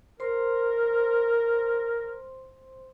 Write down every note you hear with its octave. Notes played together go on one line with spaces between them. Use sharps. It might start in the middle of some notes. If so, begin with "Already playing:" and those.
A#4 C5 C6